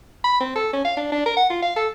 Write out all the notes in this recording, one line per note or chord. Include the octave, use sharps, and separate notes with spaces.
B5
C4
A4
C#4
F5
D4
D4
A#4
F#5
F4
F5
A4